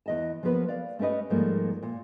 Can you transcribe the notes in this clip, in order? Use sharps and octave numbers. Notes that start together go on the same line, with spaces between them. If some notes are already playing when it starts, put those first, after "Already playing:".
E2 D#5 A5
F3 F#3 A#3 B3 B4
D5 F5
A3 C#4 G4 B4 D#5
G#2 F3 G3 A3 A#3
A#2